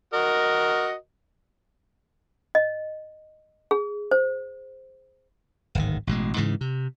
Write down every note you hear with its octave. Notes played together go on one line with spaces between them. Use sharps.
F#4 A#4 D#5
D#5
G#4
C5
D1 G#1 D#3
A1 B2 G#3
G#2 C#3 E3
C3